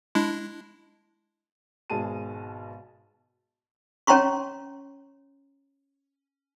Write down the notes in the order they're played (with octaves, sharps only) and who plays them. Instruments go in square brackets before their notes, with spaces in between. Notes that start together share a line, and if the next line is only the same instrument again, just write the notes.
[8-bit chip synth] G#3 D4 E4
[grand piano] G#1 B2 G#4 A5 D#7
[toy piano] C#4 C#5 G5 A#5 C6 C#6